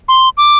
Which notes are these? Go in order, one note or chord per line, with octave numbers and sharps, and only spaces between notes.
C6
D6